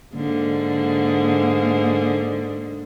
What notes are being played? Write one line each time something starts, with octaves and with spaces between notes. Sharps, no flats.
G#2 D3 A#3